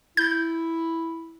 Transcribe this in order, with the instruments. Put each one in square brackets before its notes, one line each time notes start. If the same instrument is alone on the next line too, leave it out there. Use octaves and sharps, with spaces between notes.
[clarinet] E4 [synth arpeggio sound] G6